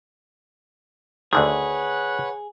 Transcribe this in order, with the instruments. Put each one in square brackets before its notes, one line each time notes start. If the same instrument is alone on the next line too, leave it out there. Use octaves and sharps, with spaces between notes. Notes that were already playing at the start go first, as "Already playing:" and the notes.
[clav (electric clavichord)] D2 D3 D#3 [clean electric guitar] G#4 [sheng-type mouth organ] B4 C#5 F#5